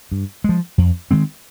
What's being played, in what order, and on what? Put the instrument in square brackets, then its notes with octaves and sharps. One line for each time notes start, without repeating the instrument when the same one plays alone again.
[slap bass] G2
F3 G#3
F2
D#3 G#3 C4